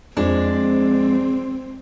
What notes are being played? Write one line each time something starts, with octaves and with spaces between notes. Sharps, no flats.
F2 G#3 C4 D4